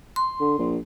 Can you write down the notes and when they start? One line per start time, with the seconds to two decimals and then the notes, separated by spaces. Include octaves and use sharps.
0.16 C6
0.40 D3
0.59 A#1